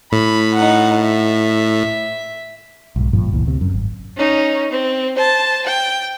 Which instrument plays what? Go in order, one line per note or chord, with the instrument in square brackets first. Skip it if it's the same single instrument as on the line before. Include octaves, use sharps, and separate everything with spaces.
[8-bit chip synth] A2 [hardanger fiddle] B5
[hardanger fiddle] D#4 F#5
E5
[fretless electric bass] B1 G#2
G#1 G2 A#2 F3
G1 C#2 A#2 E3
D2 C3
F#2
G#1
[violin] C#4 D#4
C4
C5 A5
G5